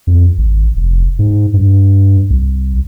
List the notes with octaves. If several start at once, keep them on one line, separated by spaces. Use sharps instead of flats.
F2
G#1
F1
G#2
G2
C2